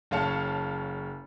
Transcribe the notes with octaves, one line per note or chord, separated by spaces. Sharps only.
F#1 C#5 F5 A5 C#7